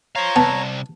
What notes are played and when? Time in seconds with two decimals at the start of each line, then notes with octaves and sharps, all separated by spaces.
0.15 C5 C#5 F5 A#5
0.36 C2 B3 A5